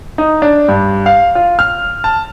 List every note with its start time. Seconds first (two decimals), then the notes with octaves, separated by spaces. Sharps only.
0.18 D#4
0.42 D4
0.68 G2
1.06 F5
1.35 F4
1.59 F6
2.04 A5